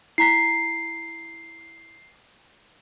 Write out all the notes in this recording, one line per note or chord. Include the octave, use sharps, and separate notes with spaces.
E4 A#5 B6 C7